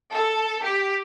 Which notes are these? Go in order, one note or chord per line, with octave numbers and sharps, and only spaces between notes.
A4
G4